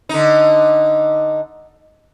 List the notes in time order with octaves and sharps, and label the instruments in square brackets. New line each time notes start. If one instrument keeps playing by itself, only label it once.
[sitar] D3 D#4